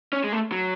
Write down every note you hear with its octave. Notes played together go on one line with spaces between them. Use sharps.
C#4
G#3
A3
F#3